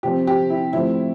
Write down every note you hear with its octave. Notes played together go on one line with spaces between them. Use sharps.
C3 F3 C4 G4
G4
E4
A2 F3 C4 E4